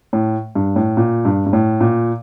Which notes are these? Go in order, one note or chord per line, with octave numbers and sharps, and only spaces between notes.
A2
G2
A2
A#2
G2
G2
A2
A#2